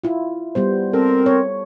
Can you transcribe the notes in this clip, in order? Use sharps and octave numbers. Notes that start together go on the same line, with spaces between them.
E4 F4
G3 B3 C5
C4 A4 A#4
C#5